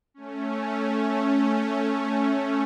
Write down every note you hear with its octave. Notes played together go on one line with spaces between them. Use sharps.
A3 C#4